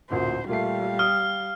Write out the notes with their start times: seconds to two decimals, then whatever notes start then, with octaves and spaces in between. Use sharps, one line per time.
0.11 A1 D2 A#2 C5
0.49 A#2 G3 A3 F5 C7
0.99 D#6 F6